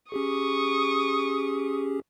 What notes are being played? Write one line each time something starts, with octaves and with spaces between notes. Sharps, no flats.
C#4 G4 G#4 C#6 D#6